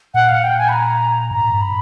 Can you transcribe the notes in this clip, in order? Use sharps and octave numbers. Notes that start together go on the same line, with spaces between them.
A#2 F#5
F5
G5
G#5
B5
A#5
G#2 A#5
G2
B5